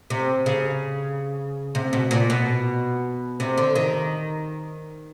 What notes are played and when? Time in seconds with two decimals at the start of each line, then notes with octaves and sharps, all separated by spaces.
0.10 C3
0.46 C#3
1.75 C3
1.93 B2
2.11 A#2
2.30 B2
3.40 C3
3.58 D3
3.75 D#3